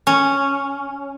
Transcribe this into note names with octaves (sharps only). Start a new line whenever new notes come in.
C#4